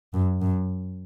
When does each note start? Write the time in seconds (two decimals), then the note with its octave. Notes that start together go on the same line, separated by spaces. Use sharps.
0.14 F#2
0.41 F#2